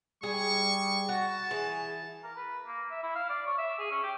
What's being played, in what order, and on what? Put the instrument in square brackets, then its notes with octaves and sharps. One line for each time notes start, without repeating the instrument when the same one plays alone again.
[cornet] G3 [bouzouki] G#4 [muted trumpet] C#6
[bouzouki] F#4 [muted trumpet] A5
[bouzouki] E3 [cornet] G#4
[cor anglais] A#4
B4
A#3
E5
E4
F5
D5
C#5
E5
G#4
C#4
G4